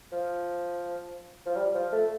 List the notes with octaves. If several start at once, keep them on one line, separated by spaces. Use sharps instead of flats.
F3
F3
G3
F3
A3